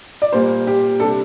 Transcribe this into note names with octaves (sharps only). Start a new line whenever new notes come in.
D5
A#2 G3 A#3 C5
G4
C3 G3 D4 A4